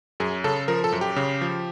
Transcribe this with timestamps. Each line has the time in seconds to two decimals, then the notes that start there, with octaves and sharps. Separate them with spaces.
0.20 F#2 G#4
0.44 C#3 A4
0.68 F3 A#4
0.84 A4
0.92 F#2
1.01 G4
1.16 C#3
1.41 F3